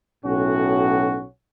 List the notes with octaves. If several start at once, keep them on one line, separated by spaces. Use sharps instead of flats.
B1 A2 C#4 F#4